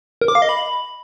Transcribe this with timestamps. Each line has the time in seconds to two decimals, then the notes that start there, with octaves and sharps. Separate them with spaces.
0.21 A#4
0.28 D6
0.35 F5
0.42 D#5
0.49 B5